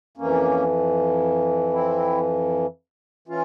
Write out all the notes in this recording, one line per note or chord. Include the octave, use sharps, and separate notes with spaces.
F2 E3 A#3 C#4
C4 E4
E3 C#4 F4